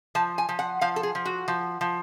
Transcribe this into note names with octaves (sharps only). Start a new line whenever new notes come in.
F3 A5
G#5
F3
F#5
F3 F5
A4
G#4
F3
F#4
F3
F3